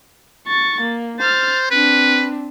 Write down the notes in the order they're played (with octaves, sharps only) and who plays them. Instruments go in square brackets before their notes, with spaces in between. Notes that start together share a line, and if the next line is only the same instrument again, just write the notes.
[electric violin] C#6 A6
A#3
[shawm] C5 [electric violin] F6 A6
[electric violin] C4 D4 [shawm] B4